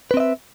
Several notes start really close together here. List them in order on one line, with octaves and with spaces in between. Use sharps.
B4 C4 D#5 E5